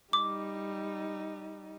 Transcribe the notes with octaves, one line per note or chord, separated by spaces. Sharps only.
G3 D#4 D6